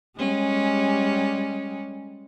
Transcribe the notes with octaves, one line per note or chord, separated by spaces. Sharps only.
G3 G#3 C#4